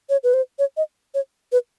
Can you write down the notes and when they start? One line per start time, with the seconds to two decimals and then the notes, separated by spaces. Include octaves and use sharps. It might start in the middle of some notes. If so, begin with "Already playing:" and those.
0.10 C#5
0.23 B4
0.34 C5
0.59 C#5
0.77 D#5
1.14 C#5
1.52 B4